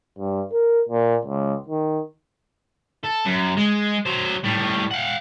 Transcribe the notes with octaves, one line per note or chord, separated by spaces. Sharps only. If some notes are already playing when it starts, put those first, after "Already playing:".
G2
A#4
A#2
C#2
D#3
A4
F#2
G#3
F#3 C5
A2 G3
F5 F#5